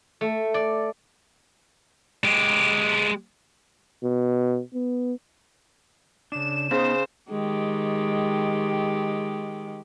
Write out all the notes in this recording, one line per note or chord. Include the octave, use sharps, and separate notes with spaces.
A3
D5
G#3 G4
B2
B3
C#3 D4 E7
C#3 B3 D#4 C5 D#5
D#3 G#3 G4